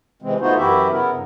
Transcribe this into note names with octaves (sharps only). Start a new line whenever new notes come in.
C3 E3 G#3 C4
A3 B3 D#4 F4 F#4 C5
F#2 E3 E4 F#4 G4 E5
C#3 B3 E4 A#4
G2 C#3